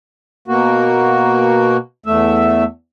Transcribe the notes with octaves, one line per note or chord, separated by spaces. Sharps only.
B2 A#3 F#4
E2 A3 E5